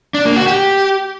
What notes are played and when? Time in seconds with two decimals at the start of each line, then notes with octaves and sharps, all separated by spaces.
0.14 D4
0.25 A#3
0.36 F#4
0.47 G4